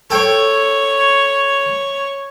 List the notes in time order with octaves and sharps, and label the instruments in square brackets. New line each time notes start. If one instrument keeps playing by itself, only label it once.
[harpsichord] A4 G5 [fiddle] C#5